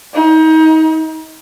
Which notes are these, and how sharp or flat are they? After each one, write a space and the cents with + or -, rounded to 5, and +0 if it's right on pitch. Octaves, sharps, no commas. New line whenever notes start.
D#4 +30